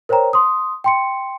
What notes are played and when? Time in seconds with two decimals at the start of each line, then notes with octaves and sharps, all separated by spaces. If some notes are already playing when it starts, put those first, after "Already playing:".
0.09 A#4 C5 C#5 G5 A#5
0.33 C6 D#6
0.84 G5 C6 C#7